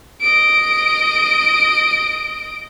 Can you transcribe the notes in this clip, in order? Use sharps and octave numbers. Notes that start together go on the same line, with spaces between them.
D#5 D7